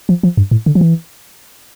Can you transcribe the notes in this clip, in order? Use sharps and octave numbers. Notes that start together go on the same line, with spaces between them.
F3
F3
G2
A2
D3
F3
E3